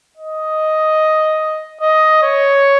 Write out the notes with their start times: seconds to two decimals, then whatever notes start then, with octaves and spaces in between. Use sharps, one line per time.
0.17 D#5
1.81 D#5
2.23 C#5